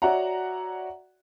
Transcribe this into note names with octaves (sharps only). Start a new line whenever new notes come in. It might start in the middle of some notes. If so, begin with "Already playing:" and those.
F#4 C#5 D5 E5 F#5 A#5